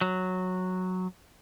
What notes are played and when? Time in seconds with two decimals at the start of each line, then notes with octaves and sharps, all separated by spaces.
0.01 F#3